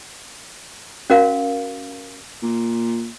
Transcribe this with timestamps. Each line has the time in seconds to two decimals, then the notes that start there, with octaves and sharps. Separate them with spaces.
1.10 C#4 F#4 A#4 F5
2.42 A#2